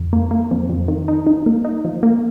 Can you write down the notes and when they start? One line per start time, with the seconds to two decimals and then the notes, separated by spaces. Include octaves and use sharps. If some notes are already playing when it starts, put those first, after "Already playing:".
Already playing: F2
0.13 A#3
0.31 A#3
0.51 F2
0.70 F2
0.88 D#3
1.08 D#4
1.27 D#4
1.46 A#3
1.65 D#4
1.85 F3
2.03 A#3